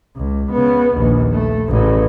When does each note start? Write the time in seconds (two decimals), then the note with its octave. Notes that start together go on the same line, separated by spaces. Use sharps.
0.16 C#2
0.51 C#3 B3
0.94 A#1 D#2
1.33 A3
1.69 A1 C#3